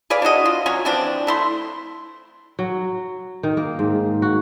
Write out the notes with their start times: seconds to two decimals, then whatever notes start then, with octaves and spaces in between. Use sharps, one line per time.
0.10 G#4 B4 D5 F5
0.22 D4 E4 F#4 D#5
0.45 F4
0.66 F#3 C#4 C#5
0.85 E3 F3 C4 D4
1.27 A3 E4 C6
2.59 F#3
3.43 D#3
3.57 A#3
3.79 G#2
4.22 F#4